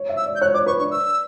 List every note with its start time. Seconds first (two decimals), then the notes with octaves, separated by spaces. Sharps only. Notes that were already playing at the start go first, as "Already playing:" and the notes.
Already playing: C#5
0.09 E5
0.17 E6
0.26 D5
0.36 G6
0.41 C#5 F#6
0.54 C#5 D6
0.66 B4 C#6
0.79 D4 C#6
0.91 E6